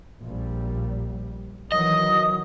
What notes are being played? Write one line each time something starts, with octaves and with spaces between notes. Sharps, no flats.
A#1 G3
D#3 E3 F#3 D#5 D#6